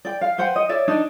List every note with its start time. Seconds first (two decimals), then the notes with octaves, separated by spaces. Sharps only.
0.05 D5 G5
0.21 F5
0.38 B4 C5 F#5 G5
0.56 D#5
0.69 C#5 D5 E5
0.88 D4 D#4 D5